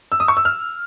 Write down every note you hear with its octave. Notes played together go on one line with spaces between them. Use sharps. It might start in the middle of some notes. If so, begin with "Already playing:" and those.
E6
D#6
C#6
E6
F6